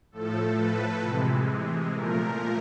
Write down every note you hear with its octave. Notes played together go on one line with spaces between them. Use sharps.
A2 F3 A3 A4
B4
C3 E3 G#3
A#2 F3 A3 A#4